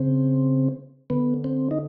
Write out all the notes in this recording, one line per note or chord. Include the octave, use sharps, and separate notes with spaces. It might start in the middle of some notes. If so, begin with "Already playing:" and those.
Already playing: C#3 C4
D3 B3
C4
D#4